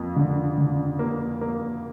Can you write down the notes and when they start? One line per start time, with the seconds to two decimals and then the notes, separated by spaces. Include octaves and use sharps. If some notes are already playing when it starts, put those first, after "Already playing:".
Already playing: F2 A#3
0.16 D3
0.58 D3
0.99 A#3
1.41 A#3